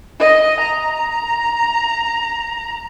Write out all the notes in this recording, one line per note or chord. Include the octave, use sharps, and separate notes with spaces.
D#5
A#5